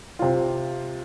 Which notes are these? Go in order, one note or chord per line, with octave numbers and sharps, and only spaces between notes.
C3 F4